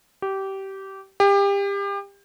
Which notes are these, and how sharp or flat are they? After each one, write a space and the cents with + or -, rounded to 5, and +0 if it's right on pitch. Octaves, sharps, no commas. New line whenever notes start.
G4 -20
G4 +30